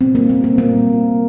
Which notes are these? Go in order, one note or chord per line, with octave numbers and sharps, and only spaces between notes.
A#2 G3 A#3 C4
A#3
C4
A#3
A#2 G3 A#3